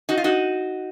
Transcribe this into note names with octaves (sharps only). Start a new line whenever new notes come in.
D#4 F#4
F4
D#4 F#4